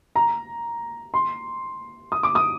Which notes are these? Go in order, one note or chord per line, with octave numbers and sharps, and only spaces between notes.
A#5
C6
D#6
D6
D#6